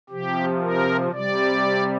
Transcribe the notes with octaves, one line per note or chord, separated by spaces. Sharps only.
C3 F3 G4
A#4
C3 G3 D5